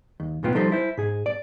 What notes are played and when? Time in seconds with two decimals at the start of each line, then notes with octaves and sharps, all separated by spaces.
0.20 D#2
0.43 B1 A2 B3 F4 G5
0.55 F3 G3 D#4 A4 C5
0.72 E4 C5
0.97 G#2 G#4
1.26 D5